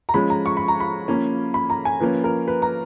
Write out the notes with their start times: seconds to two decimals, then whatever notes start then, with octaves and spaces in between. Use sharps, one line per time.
0.09 A#5
0.14 F3 G#3 C#4 B5
0.30 A#5
0.46 C#6
0.57 B5
0.68 A#5
0.80 B5
1.08 F3 A#3 C#4
1.54 B5
1.70 A#5
1.85 G#5
2.00 F3 A#3 C#4 B4
2.24 A#4
2.48 B4
2.62 A#5